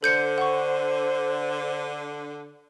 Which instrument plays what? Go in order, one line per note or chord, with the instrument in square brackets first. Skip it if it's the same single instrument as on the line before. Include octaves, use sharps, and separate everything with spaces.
[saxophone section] D3 [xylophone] A4 G6 C#7 [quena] C5
[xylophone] F#5 C#6